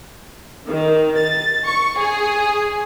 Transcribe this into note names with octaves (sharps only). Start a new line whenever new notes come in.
D#3
A6
C#6
G#4